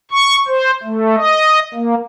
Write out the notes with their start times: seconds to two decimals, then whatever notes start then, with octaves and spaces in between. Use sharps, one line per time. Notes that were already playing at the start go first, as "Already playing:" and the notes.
0.11 C#6
0.48 C5
0.83 A3
1.16 D#5
1.74 A#3